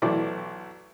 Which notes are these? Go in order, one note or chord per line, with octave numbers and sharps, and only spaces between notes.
B1 E3 F#3 A3 D5 D6